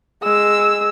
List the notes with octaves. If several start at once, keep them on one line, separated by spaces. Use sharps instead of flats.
G#3 E6